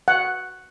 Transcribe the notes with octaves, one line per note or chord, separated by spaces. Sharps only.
F#5